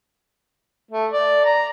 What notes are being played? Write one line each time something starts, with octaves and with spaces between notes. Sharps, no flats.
A3
D5
A#5